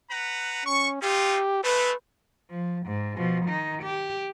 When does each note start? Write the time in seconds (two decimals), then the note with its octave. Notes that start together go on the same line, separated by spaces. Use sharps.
0.11 B4 F#5 A#5
0.65 C#4 C#6
1.02 C4 D#4 F4 G4
1.64 G#3 A3 B4
2.51 F3
2.86 G#2
3.17 B2 F3
3.46 D#3 D#4
3.82 G4